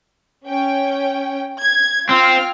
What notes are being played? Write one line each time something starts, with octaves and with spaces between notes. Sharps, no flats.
C#4 G5
G#6
C4 F4 G5 F6